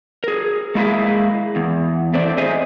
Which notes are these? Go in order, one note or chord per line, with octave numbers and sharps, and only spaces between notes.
G#4 A#4
G#3 A#3 E4 G#4 E5 F5
E2
A3 C4 D5
G#4 C5 D#5 E5 G#5